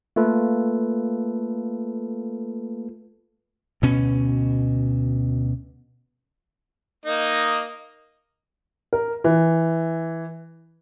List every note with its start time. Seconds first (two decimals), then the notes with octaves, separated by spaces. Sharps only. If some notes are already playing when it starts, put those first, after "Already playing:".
0.16 A3 A#3 F4 A4 B4
3.82 D2 B2 C#4
7.05 A#3 D#4 D#5
8.93 A#4
9.24 E3